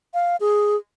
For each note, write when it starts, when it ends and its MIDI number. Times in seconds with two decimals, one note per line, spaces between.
0.14 0.36 77
0.40 0.76 68